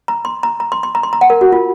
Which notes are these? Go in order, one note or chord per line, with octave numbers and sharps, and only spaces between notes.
A#5
C6
A#5
A#5
C6
C6
A#5
C6
A#5
F#5
A#4
F#4
F4